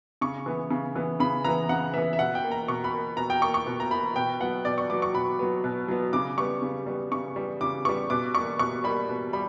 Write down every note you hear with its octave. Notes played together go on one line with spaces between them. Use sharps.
C#3 C#6
E3 B3
C#3
E3 B3
C#3 B5
E3 B3 A#5
C#3 F#5
E3 B3 E5
E5
B2 F#5
G5
A#3
A#5
B2 C#6
B5
A#3
B2 A#5
G5
A#3 C#6
C#6
B2
A#5
A#3 B5
B2 G5
F#3 B3 F#5
B2 D5
C#6
F#3 B3 D6
C#6
B2 B5
F#3 B3
B2
F#3 B3
C#3 D6
G3 B3 C#6
C#3
G3 B3
C#3 C#6
G3 B3
C#3 D6
G3 B3 C#6
B2 D6
G3 A#3 C#6
B2 C#6
G3 A#3 B5
B2
G3 B5